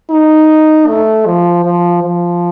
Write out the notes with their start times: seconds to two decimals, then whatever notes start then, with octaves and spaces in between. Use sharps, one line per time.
0.11 D#4
0.87 A3
1.26 F3
1.65 F3
2.03 F3